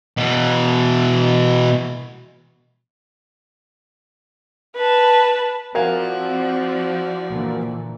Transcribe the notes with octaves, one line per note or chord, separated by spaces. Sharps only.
B2 E3
B4 A5
F3 C4 E4 F#4 A#4 D5 F5 G#5
A#2 D3 E3